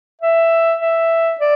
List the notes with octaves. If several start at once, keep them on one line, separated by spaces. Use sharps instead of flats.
E5
E5
D5